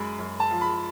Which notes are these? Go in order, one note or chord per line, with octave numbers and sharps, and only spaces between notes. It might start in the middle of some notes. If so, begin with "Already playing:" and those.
Already playing: F#2 G#3 B5
F#2
A5
F3
B5